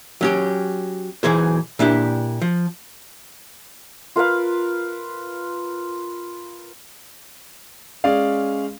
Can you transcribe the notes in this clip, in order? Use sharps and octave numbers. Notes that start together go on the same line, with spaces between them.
F#3 C#4 G4
B1 E3 G#4 C5
A#2 D4 E4 G4
F3
F4 A#4 B4 F5
G#3 C#4 G#4 D5 F5